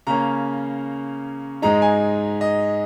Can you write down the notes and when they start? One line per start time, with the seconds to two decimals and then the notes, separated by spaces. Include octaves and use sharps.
0.07 C#3 A#3 C#4 A#5
1.62 G#2 G#3 D#4 A#5
1.82 G#5
2.41 D#5